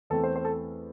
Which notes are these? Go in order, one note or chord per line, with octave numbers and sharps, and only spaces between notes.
E2 E3 A3 C4 A4
C5
C5
A4